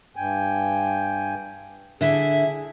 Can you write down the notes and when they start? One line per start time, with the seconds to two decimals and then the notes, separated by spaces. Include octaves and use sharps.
0.16 G2 G5 G#5
2.01 D3 E4 G#4 E5